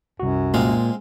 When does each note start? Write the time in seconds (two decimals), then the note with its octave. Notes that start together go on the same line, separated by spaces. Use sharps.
0.20 C2 F#2 F#4
0.54 A#2 G#3 C4 F5